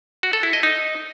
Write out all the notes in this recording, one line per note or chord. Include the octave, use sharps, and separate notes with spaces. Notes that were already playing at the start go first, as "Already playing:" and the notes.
F#4
A4
E4
D#5
D#4